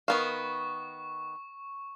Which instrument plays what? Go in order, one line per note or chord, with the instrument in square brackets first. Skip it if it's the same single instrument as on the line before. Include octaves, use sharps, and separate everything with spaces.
[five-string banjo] D#3 B3 F5 [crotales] C#6